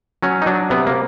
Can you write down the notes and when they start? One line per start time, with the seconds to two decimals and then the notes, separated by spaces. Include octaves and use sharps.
0.23 F#3 C#4
0.42 D#4
0.46 F#3 D4
0.70 C3 B3
0.87 A#3